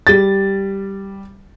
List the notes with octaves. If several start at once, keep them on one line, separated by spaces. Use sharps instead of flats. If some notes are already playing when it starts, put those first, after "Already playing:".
G3 A6